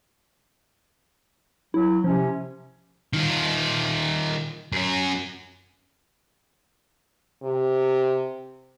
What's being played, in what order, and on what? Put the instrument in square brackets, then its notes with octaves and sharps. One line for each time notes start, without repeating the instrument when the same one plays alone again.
[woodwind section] F#3 [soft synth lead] E4
[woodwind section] C3 C#4 [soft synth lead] F3
[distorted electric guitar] D#3 F4
F#2 C#4
[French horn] C3